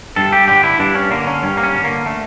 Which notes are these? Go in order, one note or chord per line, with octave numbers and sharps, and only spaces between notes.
G2 A4
G4
D3 G4
E4
G2 D4
C#4
D3 A#3
C#4
G2 C#4
A#3
C#4
D3
A#3
A3